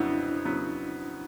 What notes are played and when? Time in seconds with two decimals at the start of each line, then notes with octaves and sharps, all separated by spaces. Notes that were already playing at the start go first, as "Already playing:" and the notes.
Already playing: F2 C#3 F#3 B3 D4 E4
0.45 C#3 F#3 B3